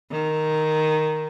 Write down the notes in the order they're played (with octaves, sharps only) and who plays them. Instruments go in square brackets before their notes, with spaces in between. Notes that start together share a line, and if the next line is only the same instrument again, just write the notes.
[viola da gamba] D#3